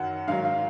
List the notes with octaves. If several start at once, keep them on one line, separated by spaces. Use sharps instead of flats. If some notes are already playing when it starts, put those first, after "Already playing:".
Already playing: F#2 D#3 F#3 F#5
G#2 D#3 F#3 F5
F5